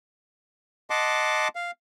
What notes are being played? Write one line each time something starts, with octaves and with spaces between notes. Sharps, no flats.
D#5 F#5 A5 C6 D6
F5